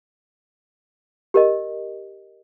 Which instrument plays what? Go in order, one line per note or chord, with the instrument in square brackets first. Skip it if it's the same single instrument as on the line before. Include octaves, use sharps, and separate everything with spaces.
[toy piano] G4 A#4 D#5